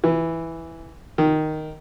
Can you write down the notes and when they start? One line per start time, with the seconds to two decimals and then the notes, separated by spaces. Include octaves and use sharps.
0.04 E3
1.18 D#3